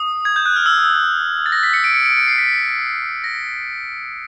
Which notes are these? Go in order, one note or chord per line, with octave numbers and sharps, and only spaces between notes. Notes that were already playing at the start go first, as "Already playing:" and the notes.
Already playing: D#6
G#6
G6
F#6
F6
E6
A6
A#6
B6
C#7
D7
C#7
D7
C#7
C7
B6
A#6